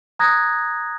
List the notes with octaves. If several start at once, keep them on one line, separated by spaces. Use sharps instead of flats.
A#5 D#6 F#6 G#6 A#6